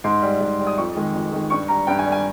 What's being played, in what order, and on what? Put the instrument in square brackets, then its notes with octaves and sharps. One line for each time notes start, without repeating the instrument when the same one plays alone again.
[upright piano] G#2 C6
G3
G#2
G3
D#6
F2 C#6
D#3 G#3
F2
D#3 G#3
G2 C#6
G3 A#5
G2 G5
G#5
G3
G#5